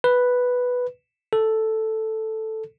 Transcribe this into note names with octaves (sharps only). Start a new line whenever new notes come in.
B4
A4